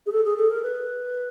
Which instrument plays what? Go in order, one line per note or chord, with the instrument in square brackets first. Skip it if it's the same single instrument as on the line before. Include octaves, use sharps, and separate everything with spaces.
[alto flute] G#4
A4
G#4
A4
A#4
B4